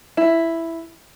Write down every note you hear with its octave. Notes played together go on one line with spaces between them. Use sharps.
E4